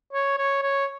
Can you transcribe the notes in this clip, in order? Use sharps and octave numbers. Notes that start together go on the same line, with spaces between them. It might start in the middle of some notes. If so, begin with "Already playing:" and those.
C#5
C#5
C#5